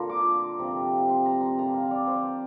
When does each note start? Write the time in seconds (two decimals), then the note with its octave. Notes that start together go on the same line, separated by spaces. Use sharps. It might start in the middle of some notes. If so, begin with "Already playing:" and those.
Already playing: A#2 D3 A#3 D4 F4 A#5 C6
0.09 D6
0.59 C3 F3 C4
1.09 C6
1.25 A#5
1.41 C6
1.58 D3 A#3 D4 F4 A#5
1.74 F5
1.91 D5
2.07 C5